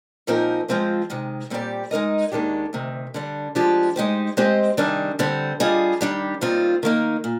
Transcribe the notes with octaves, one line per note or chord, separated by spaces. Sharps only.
A#2 F3 C4 D#4 A#4
F3 G#3 C4 F4 C5
C3 D#3 G#3
A#2 G3 C4 G4 D5
G#3 D#4 A#4 D#5
D#2 D#3 G#3 D4 G4
D2 C3 D#3
D3 G3 D4
F3 G#3 D4 G4
G#3 D#4 G4 C5
G#3 C4 G4 C5 D#5
C3 D#3 G3 D4 G#4
D3 G3 C4
G3 D4 F4 G#4 D#5
D#3 G3 D4 G4
D#2 D#3 G3 C4 F4
D#3 A#3 D#4
A#2